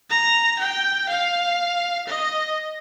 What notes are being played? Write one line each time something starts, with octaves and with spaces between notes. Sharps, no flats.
A#5
G5
F5
D#5